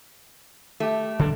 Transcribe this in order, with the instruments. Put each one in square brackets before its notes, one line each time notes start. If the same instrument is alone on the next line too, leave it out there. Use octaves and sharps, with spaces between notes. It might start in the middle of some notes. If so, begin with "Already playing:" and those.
[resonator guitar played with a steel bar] A3 G4
[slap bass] D3 D4